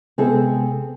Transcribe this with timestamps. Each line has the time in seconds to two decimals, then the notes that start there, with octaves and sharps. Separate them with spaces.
0.18 C3 G#3 B3 C4 G#4 A4